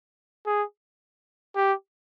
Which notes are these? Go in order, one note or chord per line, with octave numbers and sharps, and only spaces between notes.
G#4
G4